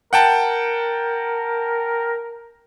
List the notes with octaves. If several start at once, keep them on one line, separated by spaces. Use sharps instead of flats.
A#4 F#5 G5 A5